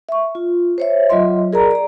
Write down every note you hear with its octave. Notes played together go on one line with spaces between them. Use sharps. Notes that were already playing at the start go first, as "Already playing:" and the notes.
E5 C#6
F4
C5 C#5 E5
F#3 F4 D#5 E5 C6
G#4 A#4 D5 A#5
D5 A#5